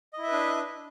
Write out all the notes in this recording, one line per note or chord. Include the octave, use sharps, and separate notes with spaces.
D4 E4 B4 D#5 E5